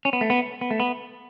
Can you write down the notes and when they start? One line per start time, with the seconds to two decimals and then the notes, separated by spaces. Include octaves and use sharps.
0.05 C#4
0.13 B3
0.21 A3
0.30 B3
0.61 B3
0.71 A3
0.80 B3